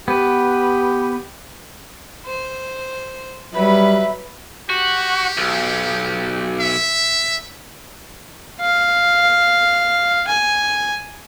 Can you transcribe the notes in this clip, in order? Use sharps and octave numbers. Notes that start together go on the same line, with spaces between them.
B3 G4 B4
C5
F#3 G3 B4 E5 B5
F#4 G4
B1
E5
F5
G#5